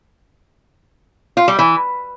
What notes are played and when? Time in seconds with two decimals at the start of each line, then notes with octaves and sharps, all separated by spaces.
1.37 F4
1.48 G3
1.59 E3